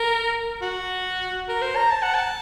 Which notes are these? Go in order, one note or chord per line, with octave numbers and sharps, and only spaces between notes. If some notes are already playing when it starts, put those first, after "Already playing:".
Already playing: A#4
F#4
A#4
C5
A#5
A5
F#5
A5